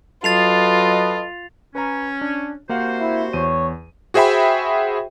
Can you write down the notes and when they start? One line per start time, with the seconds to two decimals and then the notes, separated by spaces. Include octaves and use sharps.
0.24 F#3 F4 A4 B4 D#5 A6 C7 F7
1.75 C#4 B4 A#5
2.21 D4
2.69 C3 A#3 F#4 C5 F5 F#5
3.00 E4
3.33 E2 C#5 D#7
4.14 F#4 G#4 C5 E5 G5 B5